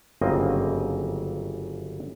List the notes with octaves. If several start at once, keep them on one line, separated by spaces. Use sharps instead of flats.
G1 F#2 C#3 A#3 C4 D#5